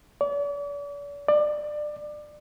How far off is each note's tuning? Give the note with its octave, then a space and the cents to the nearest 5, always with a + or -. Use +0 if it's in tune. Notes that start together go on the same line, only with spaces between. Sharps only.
D5 -40
D5 +25